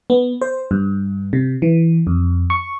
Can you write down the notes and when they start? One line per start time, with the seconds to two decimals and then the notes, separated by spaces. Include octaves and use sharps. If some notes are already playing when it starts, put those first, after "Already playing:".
0.10 B3
0.41 C5
0.71 G2
1.33 C3
1.62 E3
2.07 F2
2.50 C#6